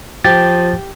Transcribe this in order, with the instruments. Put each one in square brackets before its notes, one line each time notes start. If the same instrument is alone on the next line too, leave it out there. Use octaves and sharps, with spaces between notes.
[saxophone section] F3 [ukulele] G4 [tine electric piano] A6